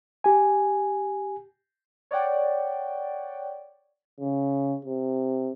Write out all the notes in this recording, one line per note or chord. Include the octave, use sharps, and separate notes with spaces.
G4 G#5
C#5 D5 F#5 G5
C#3
C3